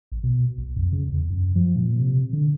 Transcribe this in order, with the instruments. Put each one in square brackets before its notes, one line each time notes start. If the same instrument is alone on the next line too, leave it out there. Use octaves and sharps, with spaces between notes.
[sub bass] A#1
B2
B1
F2
C#3
E2
F#2
F3
A#2
C3
D3